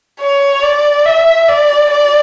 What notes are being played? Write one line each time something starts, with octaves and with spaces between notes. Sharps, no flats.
C#5
D5
E5
D5
D5